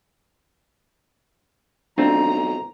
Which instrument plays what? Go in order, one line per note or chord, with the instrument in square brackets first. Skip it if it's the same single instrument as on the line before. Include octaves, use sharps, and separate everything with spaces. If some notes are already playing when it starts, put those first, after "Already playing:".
[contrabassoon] B1 [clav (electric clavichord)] A3 C4 F4 [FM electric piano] D4 [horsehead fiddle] A#5